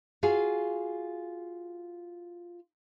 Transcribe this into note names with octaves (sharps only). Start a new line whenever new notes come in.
F4 F#4 G#4 F5